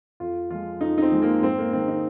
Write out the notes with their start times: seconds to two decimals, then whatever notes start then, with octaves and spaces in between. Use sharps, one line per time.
0.20 F2 F4
0.50 F3 G#3 F4
0.81 F2 D#4
0.98 D#4
1.02 C4
1.12 F3 G#3
1.22 A#3
1.42 G#2 C4
1.58 A#3
1.73 D#3 G#3 C4
1.88 D#4